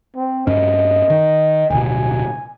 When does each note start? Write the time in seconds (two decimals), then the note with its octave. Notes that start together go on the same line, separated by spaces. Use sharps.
0.16 C4
0.47 G2 C#4 D#5
1.10 D#3
1.71 D1 B2 G#5